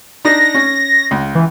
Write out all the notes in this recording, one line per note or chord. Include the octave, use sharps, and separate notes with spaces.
D4 D#4 A#6
C#4
C#2
E3